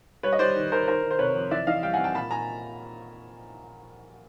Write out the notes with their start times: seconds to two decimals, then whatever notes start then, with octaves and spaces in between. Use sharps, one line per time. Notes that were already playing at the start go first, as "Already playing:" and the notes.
0.23 G3 B4 C#5
0.32 D#5
0.39 G3 C5 D5
0.56 D#3
0.71 D#3 A#4 C5
0.87 D#3 A#4 C5
1.03 D#3
1.11 C5
1.19 C3 B4 C#5
1.35 F2
1.51 E3 D5 E5
1.67 E3 D#5 F5
1.83 G3 F5 G5
1.94 F#5 G#5
1.98 C4
2.04 G5 A5
2.15 A#2 A5 B5
2.30 A#2 G#5 A#5